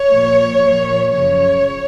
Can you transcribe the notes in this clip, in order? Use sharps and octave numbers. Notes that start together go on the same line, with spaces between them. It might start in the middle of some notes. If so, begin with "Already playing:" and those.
Already playing: C#5
A#2 F3
A#2 F3
F#2 C#3 F3 C#5